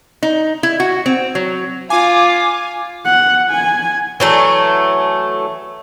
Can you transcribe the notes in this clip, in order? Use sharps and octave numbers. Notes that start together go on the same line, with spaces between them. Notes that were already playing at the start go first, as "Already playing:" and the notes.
D#4
E4
F#4
C4
F#3
F4 G#5 D6
F#5
G#5
E3 F#3 A3